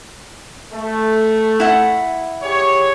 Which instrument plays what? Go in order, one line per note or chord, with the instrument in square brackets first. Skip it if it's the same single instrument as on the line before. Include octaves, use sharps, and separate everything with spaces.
[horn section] A3
[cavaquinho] E4 F#5
[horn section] G4 G#4 C#5